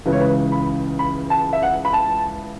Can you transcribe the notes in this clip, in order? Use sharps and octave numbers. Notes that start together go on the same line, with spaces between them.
C#2 C#3 E3 B4
C#5
B4
B5
B5
A5
E5
F#5
B5
A5